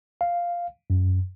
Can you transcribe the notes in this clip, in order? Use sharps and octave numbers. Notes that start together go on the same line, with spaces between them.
F5
F#2